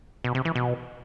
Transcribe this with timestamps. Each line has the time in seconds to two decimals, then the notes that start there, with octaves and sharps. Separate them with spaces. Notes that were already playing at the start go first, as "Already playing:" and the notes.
0.24 B2
0.35 C3
0.45 E3
0.55 B2